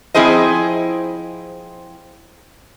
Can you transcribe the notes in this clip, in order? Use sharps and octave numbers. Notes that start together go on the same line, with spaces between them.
F3 C4 E4 G#4 C5 D#5